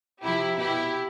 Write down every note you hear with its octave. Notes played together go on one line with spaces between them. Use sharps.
C3 F3 E4 G4
B2 E4 G4